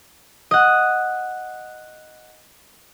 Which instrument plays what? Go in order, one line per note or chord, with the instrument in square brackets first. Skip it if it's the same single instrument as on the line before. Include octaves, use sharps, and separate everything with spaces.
[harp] D#5 F#5